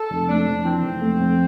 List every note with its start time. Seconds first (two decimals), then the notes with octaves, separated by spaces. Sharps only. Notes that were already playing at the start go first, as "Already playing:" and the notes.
Already playing: A4
0.10 F1
0.28 A3 D4
0.46 F2
0.64 E3 C4
0.83 F1
1.01 A3
1.20 F2